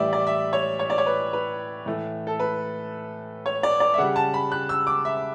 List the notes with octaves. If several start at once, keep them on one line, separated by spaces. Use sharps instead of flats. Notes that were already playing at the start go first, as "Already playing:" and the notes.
Already playing: A2 E3 G3 D5 E5
D5
E5
C#5
C#5
D5
C#5
B4
B4
A2 E3 A3
A4
B4
C#5
D5
D5
E5
C#3 G3 F#5
A5
B5
F#6
E6
D6
E5